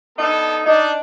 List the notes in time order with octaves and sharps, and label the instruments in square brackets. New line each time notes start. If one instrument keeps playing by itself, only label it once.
[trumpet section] B3 D4 A4 [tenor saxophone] D#4
[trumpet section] D4 [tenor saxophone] D#4 [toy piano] D#5